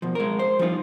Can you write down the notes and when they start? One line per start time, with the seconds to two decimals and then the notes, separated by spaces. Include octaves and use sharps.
0.02 B2 F3
0.15 G#3 A#4
0.39 C5
0.59 F3 G3 D#4 F4